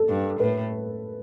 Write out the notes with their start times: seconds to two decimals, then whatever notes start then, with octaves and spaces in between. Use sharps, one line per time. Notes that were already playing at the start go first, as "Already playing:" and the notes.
Already playing: A4
0.09 G2
0.40 A2 B4